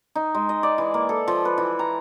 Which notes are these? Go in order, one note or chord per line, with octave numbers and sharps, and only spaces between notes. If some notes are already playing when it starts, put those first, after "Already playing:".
D#4
G#3
D#5
D5
E3
A#3
A4
F3
B4
E3
A#5